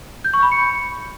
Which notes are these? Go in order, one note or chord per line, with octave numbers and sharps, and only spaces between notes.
G6
C#6
B5
C#7